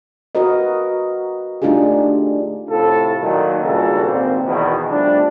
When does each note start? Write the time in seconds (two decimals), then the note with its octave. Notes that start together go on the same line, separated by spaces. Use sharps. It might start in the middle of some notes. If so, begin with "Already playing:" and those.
0.35 F#4 A#4 B4 D#5
1.62 A3 D4 D#4 F4 G4 G#4
2.69 A2 C3 F4 A4
3.21 A#2 D#3 F#3
3.63 C#2 G2 A#2 F#4 G#4 A4
4.04 G#1 A#2 C4
4.46 E2 B2 D#3
4.90 F3 G3 A3 D4